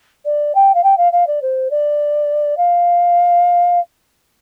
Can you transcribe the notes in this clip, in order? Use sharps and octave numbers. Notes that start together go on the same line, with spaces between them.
D5
G5
F5
G5
F5
F5
D5
C5
D5
F5